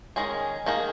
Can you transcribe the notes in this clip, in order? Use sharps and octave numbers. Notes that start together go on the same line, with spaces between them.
D#3 G#3 C#4 G#4
D#3 A#3 D#4 G#4